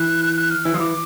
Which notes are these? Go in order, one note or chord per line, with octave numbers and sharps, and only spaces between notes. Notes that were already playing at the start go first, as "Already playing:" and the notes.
Already playing: E3 F#6
F#6
F6
E3 E6
F3 D#6
E3 D6